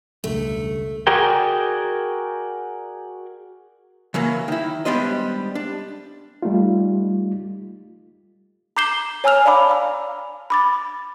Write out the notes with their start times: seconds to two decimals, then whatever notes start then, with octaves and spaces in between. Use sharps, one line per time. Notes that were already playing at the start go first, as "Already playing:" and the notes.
0.24 E1 C#2 G2 A3
1.07 F#4 G#4 A#4 D5 G5
4.14 C#3 E3 F#3 A#3
4.48 D#3 E4
4.85 G3 G#3 B3 D4 C5 D#5
5.55 D4
6.42 G3 A3 D#4 F4
8.77 A#5 D6 G6 C7 E7 G7
9.24 C#5 G#5 A#5 E6 F6 F7
9.45 D5 F5 A5 B5 D6
9.70 F5 A#5
10.50 B5 D6 A6